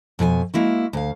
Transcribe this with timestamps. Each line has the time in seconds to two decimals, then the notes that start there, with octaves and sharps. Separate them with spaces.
0.19 F2 B2 G#4 G#5
0.54 G#3 A#3 E4 F#4
0.93 D2 F5